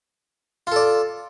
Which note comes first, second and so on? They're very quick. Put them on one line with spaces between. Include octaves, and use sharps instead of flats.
F4 A4 D5